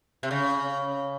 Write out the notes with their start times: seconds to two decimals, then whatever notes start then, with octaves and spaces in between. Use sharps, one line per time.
0.23 C3
0.31 C#3